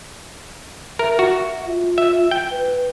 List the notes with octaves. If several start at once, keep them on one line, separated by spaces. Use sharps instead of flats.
A#4 E5
F#4
F4
E5
G5
B4